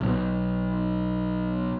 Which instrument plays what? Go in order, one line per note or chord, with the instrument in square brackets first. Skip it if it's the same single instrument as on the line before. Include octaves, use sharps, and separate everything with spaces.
[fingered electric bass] B1 B2